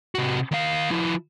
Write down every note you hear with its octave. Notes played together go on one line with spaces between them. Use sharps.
C3 F#4
D#3 F5
F3 E4